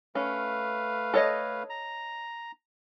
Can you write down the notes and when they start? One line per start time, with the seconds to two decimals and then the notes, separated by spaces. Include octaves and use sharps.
0.15 A3 C#4 B4 F5
1.14 A4 C#5 D#5
1.70 A#5